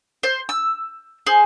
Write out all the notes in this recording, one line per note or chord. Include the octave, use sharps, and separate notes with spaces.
C5
E6
G#4 C5